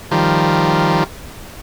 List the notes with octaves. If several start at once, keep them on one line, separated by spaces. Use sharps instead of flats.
D#3 F3 G3